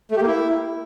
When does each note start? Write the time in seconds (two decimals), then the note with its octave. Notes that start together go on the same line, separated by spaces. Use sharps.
0.11 A3
0.17 G4
0.22 A#3
0.27 E4